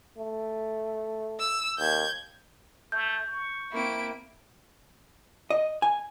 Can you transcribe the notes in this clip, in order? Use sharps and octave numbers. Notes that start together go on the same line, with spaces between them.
A3
E6
D#2 G6 G#6
A3 G6
C#6
A#3 C4 E4 D7
D#5
G#5